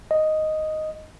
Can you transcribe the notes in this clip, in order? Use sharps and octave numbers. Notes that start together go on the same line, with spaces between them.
D#5